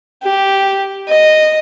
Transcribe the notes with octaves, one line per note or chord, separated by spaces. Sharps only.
G4
D#5